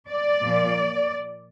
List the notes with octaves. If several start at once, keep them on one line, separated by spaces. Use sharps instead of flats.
D5
A#2 F3 A#3